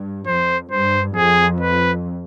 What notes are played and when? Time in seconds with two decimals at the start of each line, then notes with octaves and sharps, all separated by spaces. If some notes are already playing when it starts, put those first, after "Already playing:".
Already playing: G2
0.27 F2 C5
0.70 G2 C5
1.16 F2 G#4
1.61 B4